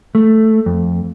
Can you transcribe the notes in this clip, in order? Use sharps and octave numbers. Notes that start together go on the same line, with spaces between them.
A3
F2